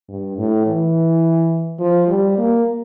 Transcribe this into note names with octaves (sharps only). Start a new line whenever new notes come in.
G2
A2
E3
F3
G3
A#3